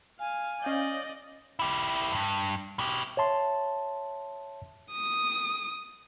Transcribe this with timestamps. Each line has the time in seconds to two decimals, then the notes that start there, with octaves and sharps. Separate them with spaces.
0.20 F5 G#5
0.62 C#4 D5 D#5 F5 G6
1.59 E4 G4
2.12 E2 G2
2.79 B2 G4
3.17 C#5 E5 A5 C6
4.93 D#6